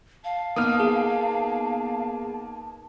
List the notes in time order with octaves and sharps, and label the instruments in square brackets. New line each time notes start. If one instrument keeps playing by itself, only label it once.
[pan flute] F5 [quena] A5
[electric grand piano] A#3 B3 D#4 [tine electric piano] D#6 F6
[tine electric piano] G#4